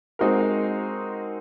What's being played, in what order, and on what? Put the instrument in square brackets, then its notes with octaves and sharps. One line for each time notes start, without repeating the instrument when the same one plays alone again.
[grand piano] G#3 C4 D#4 F#4 A#4